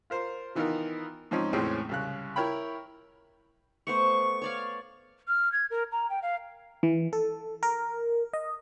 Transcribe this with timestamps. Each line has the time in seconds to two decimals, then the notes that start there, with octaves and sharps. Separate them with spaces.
0.10 F4 A#4 C5
0.55 D#3 E3 B3 D#4 F4 A#4
1.31 G#2 F3 C4 C#4 D#4
1.53 E2 A2 E3 G#3 C4 C#4
1.89 C2 C#3 F#6
2.36 E4 A#4 C#5 G5 B5
3.87 A3 B3 C5 C#6
4.42 C#5 D5 F5
5.28 F6
5.52 G#6
5.70 A#4
5.92 A#5
6.10 G5
6.22 F5
6.83 E3
7.13 A4
7.63 A#4
8.33 D#5